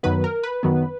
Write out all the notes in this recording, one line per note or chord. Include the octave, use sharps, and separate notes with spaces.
F#2 D#3 F#3 B3 B4
A#4
B4
F#2 D#3 F#3 B3